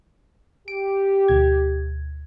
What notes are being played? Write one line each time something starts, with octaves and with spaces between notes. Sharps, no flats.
G4 D7
D2 B2 G#6